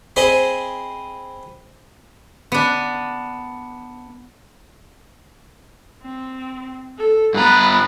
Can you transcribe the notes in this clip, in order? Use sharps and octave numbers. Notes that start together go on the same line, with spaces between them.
C4 G#4 C5 D#5 G#5 B5
B3 D4
C4
A4
G2 B3 B4 A#5